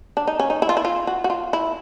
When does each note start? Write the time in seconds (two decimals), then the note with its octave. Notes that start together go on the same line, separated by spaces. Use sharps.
0.17 D4
0.27 D#4
0.40 C#4
0.50 D#4
0.62 E4
0.69 F4
0.77 E4
0.85 F4
1.07 F#4
1.24 F#4
1.30 F4
1.53 E4